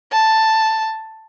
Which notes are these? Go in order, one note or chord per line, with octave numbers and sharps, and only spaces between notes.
A5